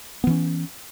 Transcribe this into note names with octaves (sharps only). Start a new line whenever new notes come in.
E3 B3 C#4